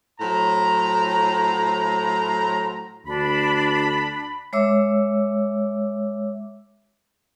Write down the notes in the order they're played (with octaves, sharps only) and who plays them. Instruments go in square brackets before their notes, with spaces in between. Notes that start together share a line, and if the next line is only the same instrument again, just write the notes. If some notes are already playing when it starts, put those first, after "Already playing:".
[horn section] A2 F#3 C5 A#5
[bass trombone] D2 [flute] D4 [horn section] B5
[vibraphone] G#3 C#5 E5 D6 E6